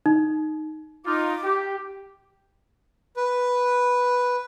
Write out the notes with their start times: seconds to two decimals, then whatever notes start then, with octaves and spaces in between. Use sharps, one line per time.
0.06 D#4
1.06 D#4 F4 D6
1.44 G4
3.17 B4